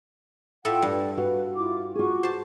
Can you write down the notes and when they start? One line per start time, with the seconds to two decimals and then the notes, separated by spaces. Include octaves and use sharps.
0.65 A2 F4 A4 E5 F#5 G5
0.82 G2 D5
1.17 F#4 B4 F5
1.56 E4 F4 D6
1.95 F4 F#4 G#4 C#6 D6
2.23 C5 A5